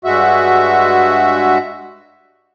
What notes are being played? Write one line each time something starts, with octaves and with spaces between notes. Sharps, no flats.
G2 G#3 F#4 E5